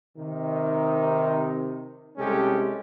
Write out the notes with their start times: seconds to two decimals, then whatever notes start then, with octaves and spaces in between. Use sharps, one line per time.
0.17 C3 D#3 D#4
2.17 C2 C3 G#3 C#4 G4 A4